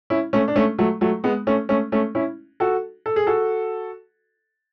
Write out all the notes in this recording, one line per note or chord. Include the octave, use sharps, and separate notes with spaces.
C#4 E4
A3 C#4
D4
A3 C#4
F#3 A3
F#3 A3
G#3 B3
A3 C#4
A3 C#4
A3 C#4
C#4 E4
F#4 A4
A4
G#4
F#4 A4